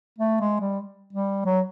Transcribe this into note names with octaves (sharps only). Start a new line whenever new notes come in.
A3
G#3
G3
G3
F#3